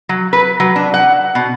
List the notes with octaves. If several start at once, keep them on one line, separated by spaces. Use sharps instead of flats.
F#3
B4
F#3
D4
F#5
B2